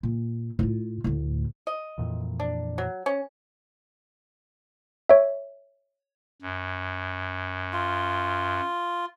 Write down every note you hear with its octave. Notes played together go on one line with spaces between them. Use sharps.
A#2
A2 F4
D2 A2
D#5
F2 A#2 E3
D4
F#3
C#4
C#5 E5
F#2
F4